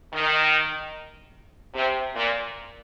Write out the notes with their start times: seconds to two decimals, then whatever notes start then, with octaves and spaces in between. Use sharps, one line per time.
0.13 D#3
1.74 C3
2.15 A#2